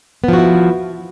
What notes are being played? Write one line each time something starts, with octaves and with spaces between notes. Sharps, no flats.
F3 B3 E4 F#4